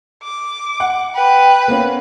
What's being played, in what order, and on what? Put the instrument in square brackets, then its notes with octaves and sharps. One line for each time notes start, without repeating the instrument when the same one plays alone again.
[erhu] D6
[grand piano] F#5
[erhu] B4 [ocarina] G5
[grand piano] A#3 B3 C#4